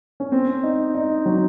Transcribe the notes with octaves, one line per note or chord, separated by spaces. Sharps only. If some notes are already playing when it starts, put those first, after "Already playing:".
C#4
C4
D#4
D#4
F#3